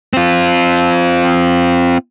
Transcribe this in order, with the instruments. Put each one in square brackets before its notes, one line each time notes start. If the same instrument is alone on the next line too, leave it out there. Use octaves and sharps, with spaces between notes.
[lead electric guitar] C4 F4